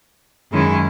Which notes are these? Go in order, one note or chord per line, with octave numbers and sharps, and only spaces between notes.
F#2 D#3 G#3 C#4 E4